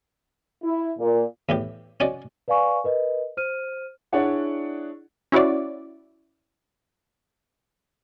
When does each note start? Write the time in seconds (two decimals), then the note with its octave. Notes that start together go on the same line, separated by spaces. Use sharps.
0.63 E4
0.98 A#2
1.49 E2 A2 G4
2.00 C#4 F#4 D5 D#5
2.48 B4 D5 F5 G#5 C#6
2.84 A#4 B4 D#5
3.37 C5 F6 D#7
4.13 D4 E4 G#4 C#5 D5 F#5
5.32 C#4 E4 F#4 C#5 D5